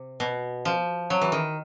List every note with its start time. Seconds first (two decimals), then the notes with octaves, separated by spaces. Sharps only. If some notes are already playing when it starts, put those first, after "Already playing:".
Already playing: C3
0.20 B2
0.65 F3
1.10 F#3
1.21 E3
1.32 D#3